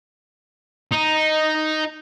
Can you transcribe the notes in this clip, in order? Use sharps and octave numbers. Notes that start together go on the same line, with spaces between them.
D#4